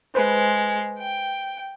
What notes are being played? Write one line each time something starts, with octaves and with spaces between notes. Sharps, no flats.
G#3 B4 C5
G5